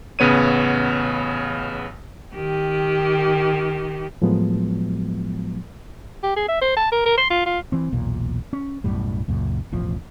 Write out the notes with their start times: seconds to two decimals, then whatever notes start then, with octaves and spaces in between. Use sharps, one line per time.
0.19 A1 C#3 B3 C#5 D#7
2.35 D#3 G4
4.22 A2 F3 F#3 G#3 B3
6.23 G4
6.36 G#4
6.48 E5
6.62 C5
6.77 A5
6.92 A#4
7.06 A#4
7.17 C6
7.30 F4
7.46 F4
7.72 E3 C4
7.92 B1 E2 A#2
8.53 C#4
8.84 B1 F#2 A2 G3
9.28 C#2 F#2 A#2
9.72 E1 A1 F3